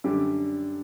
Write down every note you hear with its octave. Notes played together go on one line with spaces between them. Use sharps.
F#2 D3 G3 G4